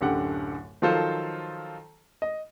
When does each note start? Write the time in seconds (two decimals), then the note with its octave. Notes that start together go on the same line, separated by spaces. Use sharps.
0.01 D1 F#2 D3 G4 F#5
0.82 D#3 F3 F#3 F4 A4 C5
2.22 D#5